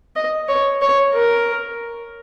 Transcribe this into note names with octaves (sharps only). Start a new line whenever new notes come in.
D#5
C#5
C#5
A#4